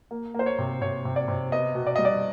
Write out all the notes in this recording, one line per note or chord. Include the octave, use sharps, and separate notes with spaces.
A#3
A#3 C5
C#5
C3
C3 C#5
C3
D5
C3
B3 D#5
B2
D5
G3 D#5
D5